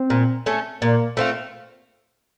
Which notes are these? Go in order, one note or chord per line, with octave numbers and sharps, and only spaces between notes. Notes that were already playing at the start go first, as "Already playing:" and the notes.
Already playing: C4
A#2
A3 C#4 A4
A#2 A#3
A3 C4 F4